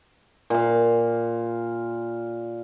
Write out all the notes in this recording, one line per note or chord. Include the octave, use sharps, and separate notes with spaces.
A#2 F5